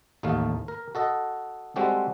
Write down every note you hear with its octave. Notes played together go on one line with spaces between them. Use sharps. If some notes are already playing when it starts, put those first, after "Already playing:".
A1 D#2 A3 D#4 F5
A#4
F#4 A4 D#5
G3 G#3 C4 F#4 G4 A4